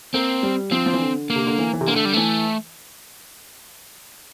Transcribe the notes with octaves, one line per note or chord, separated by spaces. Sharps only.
A#3 C4
G3
F3 C4
F3
E3
D3
A#3
C3
D3
E3
E3
C3
D3 A#3
A3
G3
E3 A3